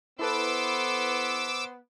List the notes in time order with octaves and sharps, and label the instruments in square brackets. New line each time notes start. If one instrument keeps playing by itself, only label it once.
[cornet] B3 [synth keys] E4 A4 B4 [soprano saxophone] C5 [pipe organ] D6 E6